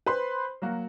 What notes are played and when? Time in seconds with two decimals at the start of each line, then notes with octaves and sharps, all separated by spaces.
0.06 B4 C5 B5 C6
0.62 F#3 A#3 F#4